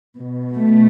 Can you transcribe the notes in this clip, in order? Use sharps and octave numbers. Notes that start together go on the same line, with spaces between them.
B2
A3